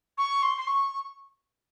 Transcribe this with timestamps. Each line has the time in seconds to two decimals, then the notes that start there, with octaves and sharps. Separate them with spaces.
0.17 C#6
0.42 C6
0.58 C6
0.67 C#6